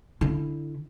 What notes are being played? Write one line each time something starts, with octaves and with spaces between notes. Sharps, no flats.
D3 E4